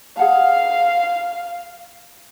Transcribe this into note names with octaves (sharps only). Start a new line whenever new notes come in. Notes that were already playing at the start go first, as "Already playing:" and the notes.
G#4 F5 F#5 A5